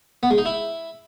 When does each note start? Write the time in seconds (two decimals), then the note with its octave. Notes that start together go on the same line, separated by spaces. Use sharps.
0.23 B3
0.30 G#3
0.38 D#4
0.46 E4